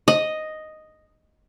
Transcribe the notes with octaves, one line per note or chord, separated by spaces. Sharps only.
D#5